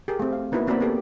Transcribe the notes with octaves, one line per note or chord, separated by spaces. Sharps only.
G4 G#4 A#4
A3 C4
F5
A#3 B3 D#4 E4 F#4 B4
A#3 C4 F#4 A#4 D5 B5
B3 G4 A4